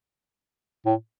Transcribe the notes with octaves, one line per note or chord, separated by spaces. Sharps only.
A2